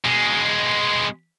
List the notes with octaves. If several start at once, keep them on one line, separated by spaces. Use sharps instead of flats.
B2 G#3